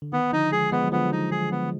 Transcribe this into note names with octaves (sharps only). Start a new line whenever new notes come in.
D3
D#3 B3
D3 F3 D#4
F3 G#3 G#4
F3 G#3 B3
F#3
D3 F3 B3
D#4
G#4
B3